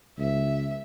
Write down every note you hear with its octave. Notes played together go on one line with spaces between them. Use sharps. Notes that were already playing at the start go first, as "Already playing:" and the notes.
C#2 E5